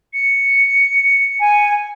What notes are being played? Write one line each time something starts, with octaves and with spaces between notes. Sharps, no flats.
C#7
G#5